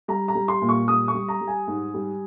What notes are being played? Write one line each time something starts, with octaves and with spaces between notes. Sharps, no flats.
G3 A#5
A#5
G3
C6
A#2
C#6
G3 D#6
C#6
G3
A#5
G3
G#5
G#2
G3